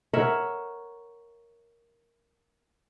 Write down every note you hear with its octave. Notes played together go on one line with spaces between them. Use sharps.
A#4 C#5 E5 F#5